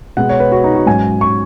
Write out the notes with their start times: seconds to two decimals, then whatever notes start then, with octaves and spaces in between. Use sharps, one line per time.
0.17 B2 G#3 B3 F#5
0.29 C#5
0.40 B4
0.52 F#4
0.64 D#4
0.75 F#4
0.86 G#2 F#3 C#4 G#5
1.21 C#6